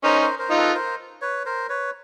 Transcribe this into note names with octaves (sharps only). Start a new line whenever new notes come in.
C#4 D#4 A#4 C5
A#4 C5
A#4 C5
D#4 F4
A4 B4
A#4 C5
B4 C#5
A#4 C5
B4 C#5